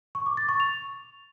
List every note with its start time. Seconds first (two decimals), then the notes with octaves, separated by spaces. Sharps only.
0.15 C#6
0.26 D6
0.37 A6
0.49 C#6
0.60 F7